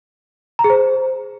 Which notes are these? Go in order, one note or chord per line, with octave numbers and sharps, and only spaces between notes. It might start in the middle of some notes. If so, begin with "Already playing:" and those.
A#5
G#4
C5